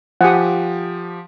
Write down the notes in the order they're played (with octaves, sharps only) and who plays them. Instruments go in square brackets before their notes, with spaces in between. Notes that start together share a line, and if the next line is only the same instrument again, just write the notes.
[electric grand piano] F3 G4 [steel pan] F#5 G#5 D#6